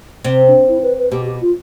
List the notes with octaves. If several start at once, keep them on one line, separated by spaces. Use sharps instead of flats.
C3 C4
D4
E4
B4
B4
B2 G4
G4
F4